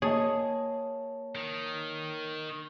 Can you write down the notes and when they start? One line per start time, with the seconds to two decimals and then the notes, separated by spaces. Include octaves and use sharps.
0.02 A#3 G#4 C#5 D#5 A5
1.35 D#3